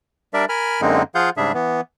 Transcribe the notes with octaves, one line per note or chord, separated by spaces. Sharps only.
G3 D4 A#4 D5 E5
A#4 G#5 B5 F6
F#2 D3 G#3 A#3 C4 D#4
F3 F4 G#4 F5 F#5 G6
G#2 C#3 G3 D4 G#4 E5
E3 B3